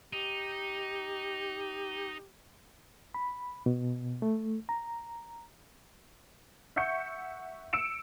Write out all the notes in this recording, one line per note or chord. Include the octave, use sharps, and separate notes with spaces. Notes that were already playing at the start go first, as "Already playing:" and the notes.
D#4 G4
B5
B2
A3
A#5
E5 F#5 C#6 G6 C#7
E6 C#7 D7 E7